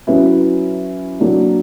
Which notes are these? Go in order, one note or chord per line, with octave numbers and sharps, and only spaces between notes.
F#3 C#4 E4 B4
F#3 A#3 D4